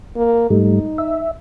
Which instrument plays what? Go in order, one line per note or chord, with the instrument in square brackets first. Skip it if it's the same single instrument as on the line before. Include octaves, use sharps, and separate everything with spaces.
[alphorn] A#3
[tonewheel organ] G#2 G3 A3 [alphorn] D#4
[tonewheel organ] E5